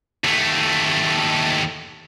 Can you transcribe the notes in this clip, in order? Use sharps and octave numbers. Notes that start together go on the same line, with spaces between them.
D#2 A3